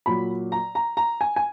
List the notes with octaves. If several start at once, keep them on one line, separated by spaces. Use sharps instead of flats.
A#2 F#3 B5
A#5
A#5
A#5
G#5
G#5